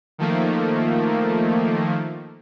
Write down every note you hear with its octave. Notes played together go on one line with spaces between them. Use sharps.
D#3 F3 A3 A#3